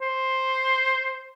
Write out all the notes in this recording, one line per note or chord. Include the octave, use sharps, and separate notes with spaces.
C5